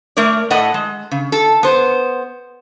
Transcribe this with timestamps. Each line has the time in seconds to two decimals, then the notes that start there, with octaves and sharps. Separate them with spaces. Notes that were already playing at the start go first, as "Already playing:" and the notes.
0.17 A3 A#4 C#5 D5
0.50 A2 A4 D#5 F#5
0.74 G#3
1.11 C#3
1.32 A4
1.63 B3 C5